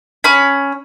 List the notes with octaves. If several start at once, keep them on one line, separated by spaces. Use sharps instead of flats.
C#4 B5